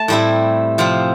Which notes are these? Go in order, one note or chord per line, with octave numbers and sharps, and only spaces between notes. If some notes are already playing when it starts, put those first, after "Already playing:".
Already playing: A3 A5
A2 G3 C4 E4
C3 F3 C4